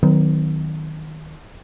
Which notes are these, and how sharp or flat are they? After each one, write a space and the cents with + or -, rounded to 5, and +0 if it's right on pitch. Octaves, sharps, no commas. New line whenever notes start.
D#3 +0 F#3 +0 B3 +40